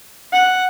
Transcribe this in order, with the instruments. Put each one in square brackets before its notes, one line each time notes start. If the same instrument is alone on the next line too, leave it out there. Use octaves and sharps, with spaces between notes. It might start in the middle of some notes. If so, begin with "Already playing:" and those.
[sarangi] F#5